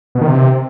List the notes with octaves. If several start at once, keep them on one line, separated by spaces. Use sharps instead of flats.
B2
D#3
C3